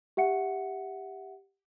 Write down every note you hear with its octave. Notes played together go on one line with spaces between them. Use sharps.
G4 E5 F#5 C#7